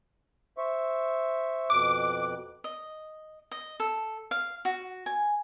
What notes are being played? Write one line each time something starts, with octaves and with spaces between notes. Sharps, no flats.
C5 E5 C#6
F2 B2 D6 F#6
D#5
D#5
A4
F5
F#4
G#5